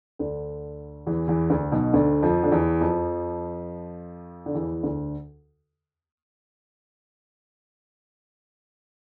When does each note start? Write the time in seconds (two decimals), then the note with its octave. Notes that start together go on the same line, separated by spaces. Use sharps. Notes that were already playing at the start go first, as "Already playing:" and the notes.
0.19 D2 D3
1.07 E2 E3
1.28 E2 E3
1.50 D2 D3
1.72 B1 B2
1.93 D2 D3
2.22 F2 F3
2.43 D3
2.51 E2 E3
2.81 F2 F3
4.46 D3
4.55 E2 E3
4.83 D2 D3